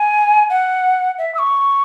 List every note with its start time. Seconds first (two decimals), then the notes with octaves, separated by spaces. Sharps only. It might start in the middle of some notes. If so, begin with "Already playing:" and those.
Already playing: G#5
0.50 F#5
1.18 E5
1.35 E6
1.39 C#6